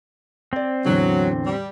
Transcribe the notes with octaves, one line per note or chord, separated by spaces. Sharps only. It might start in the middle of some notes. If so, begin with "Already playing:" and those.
C4 C5 D5
E2 A2 D3 F#3
G3